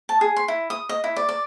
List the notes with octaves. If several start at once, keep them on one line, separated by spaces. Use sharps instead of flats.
A5
G#4
C6
E4
D#6
D#5
E4
D5
D5